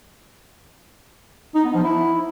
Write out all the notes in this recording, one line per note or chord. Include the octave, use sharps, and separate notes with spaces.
D#4
B3
F3
E4